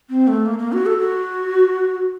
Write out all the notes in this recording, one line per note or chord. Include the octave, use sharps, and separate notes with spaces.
C4
A3
A#3
A#3
F#4
A4
F#4